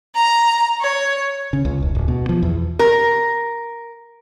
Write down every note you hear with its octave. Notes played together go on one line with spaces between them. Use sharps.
A#5
C#5
C#3
C#2
E1
D1
B2
F3
E2
A#4